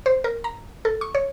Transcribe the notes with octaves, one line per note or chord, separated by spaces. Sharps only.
C5
A#4
A#5
A4
C#6
C#5